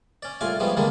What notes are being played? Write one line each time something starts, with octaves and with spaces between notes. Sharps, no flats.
C#4 D5
C2 A2 F4 G#5 D6
F3 G3 G#3 B3 C#4
D3 D#3 G3 G#3 A#3 D4